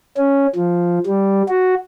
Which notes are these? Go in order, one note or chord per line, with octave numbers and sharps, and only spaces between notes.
C#4
F3
G3
F#4